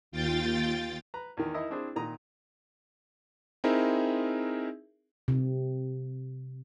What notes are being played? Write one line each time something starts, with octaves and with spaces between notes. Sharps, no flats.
D#2 F4 G5 A6
B4 A#5
E2 D#3
D#4 E4 A#4 D#5 E5
C4 D4 E4 G#4 C5
A#2 D#3 A#5 D#6
C4 D#4 E4 G#4 A#4 E5
C3